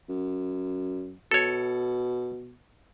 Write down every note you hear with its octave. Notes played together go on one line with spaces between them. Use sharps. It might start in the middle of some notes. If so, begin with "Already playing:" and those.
F#2
B2 A4 C#5